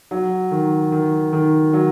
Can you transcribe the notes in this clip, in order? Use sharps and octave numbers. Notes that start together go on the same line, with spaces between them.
F#3
D#3
D#3
D#3
F#3